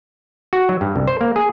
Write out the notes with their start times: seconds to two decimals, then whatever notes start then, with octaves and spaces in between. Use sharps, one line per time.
0.53 F#4
0.69 F#3
0.81 G2
0.96 C2
1.08 C5
1.21 A#3
1.36 G#4